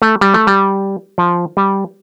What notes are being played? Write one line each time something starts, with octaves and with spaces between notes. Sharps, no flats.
A3
G3
A3
G3
F3
G3